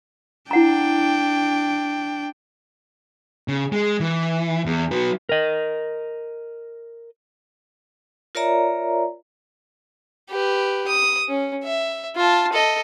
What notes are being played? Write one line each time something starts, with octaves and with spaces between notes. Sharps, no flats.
D4 E4 F#5 G5 A#5
C#3
G#3
E3
E2
F#3 B4
A#4 D#5
F4 A#4 C#5 D5 E5 A#5
G4 B4
D#6
C#4
E5
F4 A5
A4 D#5